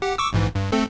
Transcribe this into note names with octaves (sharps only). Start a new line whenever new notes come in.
G4 F#5
C#6 D6 E6
A#1 G#2 E3
G2
A3 C4 A4